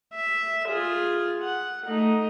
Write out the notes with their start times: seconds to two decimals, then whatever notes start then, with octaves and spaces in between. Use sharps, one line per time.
0.14 E5
0.68 F4 G#4
1.42 F#5
1.86 A3 D#4